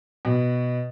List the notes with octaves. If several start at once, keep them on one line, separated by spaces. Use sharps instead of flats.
B2